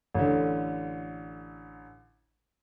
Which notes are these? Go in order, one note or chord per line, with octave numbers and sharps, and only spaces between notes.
A1 D3